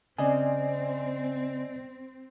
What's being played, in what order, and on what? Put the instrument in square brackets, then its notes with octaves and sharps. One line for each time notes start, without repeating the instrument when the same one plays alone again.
[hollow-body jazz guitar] C#3 [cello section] C4 [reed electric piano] D5 D#5 G#5